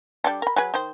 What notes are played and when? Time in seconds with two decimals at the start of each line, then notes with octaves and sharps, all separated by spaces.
0.24 G3 D4 A4
0.42 A#4 B5
0.56 F#3 G#4 B4
0.74 D#3 C5